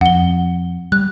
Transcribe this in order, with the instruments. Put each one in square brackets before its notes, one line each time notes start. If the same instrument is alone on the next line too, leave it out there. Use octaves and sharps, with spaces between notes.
[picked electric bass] F2 [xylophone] F#5 G7
[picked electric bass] G3 [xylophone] F#6